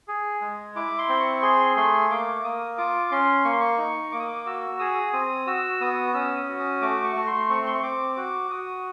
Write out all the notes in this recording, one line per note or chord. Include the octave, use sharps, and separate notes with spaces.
G#4
G#3
E4 D6
C6
C4
C#6
G#4 C6
A3 C6
A#3 D6
A#3 D#6
F4 D6
C#4 C6
A#3 C#6
C6
C#6
D#4
A#3 D6
D#6
D6
F#4 E6
G#4 D#6
C4 D#6
F#4 E6
B3 D#6
C#4 E6
D#6
F#4
D#6
A3 D6
C#6
A3
C6
C4 C#6
C6
C#6
C4 D6
F#4 D6
F#4 D#6